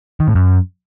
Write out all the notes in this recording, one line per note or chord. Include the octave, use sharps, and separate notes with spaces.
D#3
A2
F#2